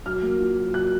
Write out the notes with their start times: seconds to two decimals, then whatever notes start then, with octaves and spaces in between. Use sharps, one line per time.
0.05 F#3 F6
0.23 A#3
0.39 F4
0.57 F#3
0.74 F#3 F#6